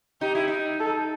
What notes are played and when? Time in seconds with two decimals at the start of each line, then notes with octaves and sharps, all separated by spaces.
0.21 D#4 G4
0.35 E4
0.48 D#4
0.80 A4